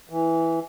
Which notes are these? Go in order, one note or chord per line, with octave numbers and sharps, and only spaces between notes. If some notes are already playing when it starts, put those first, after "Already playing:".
E3